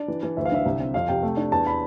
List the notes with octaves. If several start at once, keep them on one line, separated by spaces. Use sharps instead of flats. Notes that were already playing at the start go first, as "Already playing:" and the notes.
Already playing: D4 D5
E3
E3
D2 E5
F5
D3 E5
C2
C4
F2 F5
C3 G5
A3
D4
E2 A5
B5